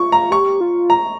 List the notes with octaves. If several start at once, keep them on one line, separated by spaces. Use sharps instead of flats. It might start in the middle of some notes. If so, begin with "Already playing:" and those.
Already playing: F4 C#6
A#5
G4 C#6
F4
A#5